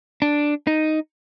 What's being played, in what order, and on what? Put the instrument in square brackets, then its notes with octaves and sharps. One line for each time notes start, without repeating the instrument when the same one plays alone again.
[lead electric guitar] D4
D#4